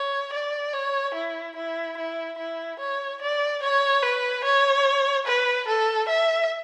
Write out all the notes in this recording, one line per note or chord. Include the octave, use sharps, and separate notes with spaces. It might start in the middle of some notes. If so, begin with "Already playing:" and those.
Already playing: C#5
D5
C#5
E4
E4
E4
E4
C#5
D5
C#5
B4
C#5
B4
A4
E5